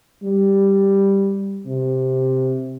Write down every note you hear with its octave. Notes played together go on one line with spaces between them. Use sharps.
G3
C3